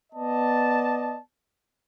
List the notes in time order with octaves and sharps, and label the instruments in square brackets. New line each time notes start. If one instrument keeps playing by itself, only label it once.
[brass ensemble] B3 D5 D#5 A5